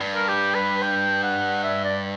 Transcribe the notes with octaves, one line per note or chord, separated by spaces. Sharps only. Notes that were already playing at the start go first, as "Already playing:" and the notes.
G2
A#4
G4
B4
G5
F#5
E5
D5